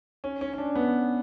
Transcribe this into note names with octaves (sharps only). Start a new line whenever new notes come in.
C#4
C#4
C#4
D4
B3